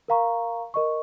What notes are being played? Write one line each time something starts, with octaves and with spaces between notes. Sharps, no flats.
A#4 F5 A#5 C#6
A#4 D#5 C#6